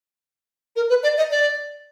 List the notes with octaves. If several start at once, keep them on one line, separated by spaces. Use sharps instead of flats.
A#4
B4
D5
D#5
D5